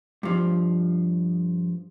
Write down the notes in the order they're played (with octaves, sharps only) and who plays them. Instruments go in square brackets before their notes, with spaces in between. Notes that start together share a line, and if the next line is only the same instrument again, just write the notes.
[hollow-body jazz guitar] G2 F3